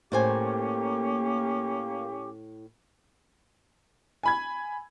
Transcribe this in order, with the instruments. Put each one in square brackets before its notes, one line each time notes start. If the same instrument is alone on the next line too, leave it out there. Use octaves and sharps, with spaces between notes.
[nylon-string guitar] A2 C5 G#5 [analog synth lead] A#3 [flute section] C#4 G4 D6
[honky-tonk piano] G#5 B5 G#6